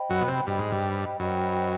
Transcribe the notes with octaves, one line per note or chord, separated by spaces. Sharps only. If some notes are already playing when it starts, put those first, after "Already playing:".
Already playing: C5 D#5 G5 B5
F#2 F#3
B2
C3
G2 C5 D#5 G5 B5
G#2
G2
F#2 C5 D#5 G5 B5